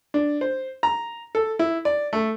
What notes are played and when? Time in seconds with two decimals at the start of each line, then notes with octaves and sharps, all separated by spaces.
0.14 D4
0.41 C5
0.83 A#5
1.35 A4
1.59 E4
1.85 D5
2.13 A3